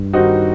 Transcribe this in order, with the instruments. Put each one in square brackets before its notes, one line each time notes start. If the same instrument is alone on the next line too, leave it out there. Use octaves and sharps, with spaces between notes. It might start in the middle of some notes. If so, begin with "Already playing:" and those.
Already playing: [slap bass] G2
[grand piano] D#3 G3 C4 D#4 F#4